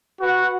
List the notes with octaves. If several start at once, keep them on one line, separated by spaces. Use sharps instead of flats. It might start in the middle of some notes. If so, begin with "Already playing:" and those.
F#4 B4 F#5